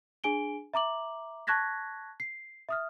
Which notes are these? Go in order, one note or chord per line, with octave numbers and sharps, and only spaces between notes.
D4 G#4 G#5 D7 G7
E5 A#5 D6 F#7
A5 C#6 F#6 G#6 A#6 B6
C7
E5 D#6 F6